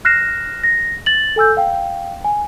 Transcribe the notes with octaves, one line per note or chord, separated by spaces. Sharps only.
F6 F#6 A#6 C7 E7
A#6
A6 F#7
A4 G#5 E6 G6
F5 G5
G#5